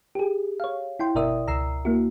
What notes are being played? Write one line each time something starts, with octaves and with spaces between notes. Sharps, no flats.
G4 G#4
C#5 F5
E4 G5 C6
G1 B2 A#4 D5 E5 D#6
C#2 A#5 E6 C7
A#3 E4 F#4